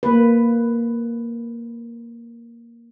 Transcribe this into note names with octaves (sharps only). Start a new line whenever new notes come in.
A#3 B4